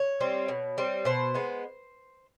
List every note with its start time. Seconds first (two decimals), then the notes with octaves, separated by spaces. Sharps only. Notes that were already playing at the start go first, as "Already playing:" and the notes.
Already playing: C#5
0.20 G3 C4
0.48 B2
0.78 G3 C4
1.05 B2 C5
1.34 G#3 B3